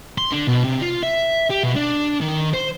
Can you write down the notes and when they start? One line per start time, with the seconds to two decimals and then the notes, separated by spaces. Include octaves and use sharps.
0.18 C6
0.32 D3
0.48 B2
0.65 C3
0.82 F4
1.03 E5
1.50 G4
1.63 B2
1.76 D4
2.21 D#3
2.54 C5